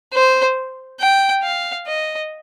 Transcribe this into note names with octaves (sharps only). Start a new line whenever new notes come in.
C5
G5
F5
D#5